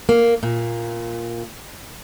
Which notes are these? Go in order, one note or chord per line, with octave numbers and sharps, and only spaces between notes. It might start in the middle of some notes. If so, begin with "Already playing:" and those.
A#3
A#2